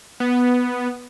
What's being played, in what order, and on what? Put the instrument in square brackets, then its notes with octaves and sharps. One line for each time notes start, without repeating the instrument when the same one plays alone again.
[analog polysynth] B3